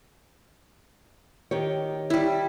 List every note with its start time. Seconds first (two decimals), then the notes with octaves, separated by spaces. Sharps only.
1.51 D#3 G4 C#5
2.10 G3 E4